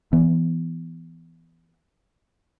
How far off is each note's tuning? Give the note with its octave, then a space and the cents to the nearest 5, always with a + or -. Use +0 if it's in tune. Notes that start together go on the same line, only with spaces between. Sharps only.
E3 +15 B3 +0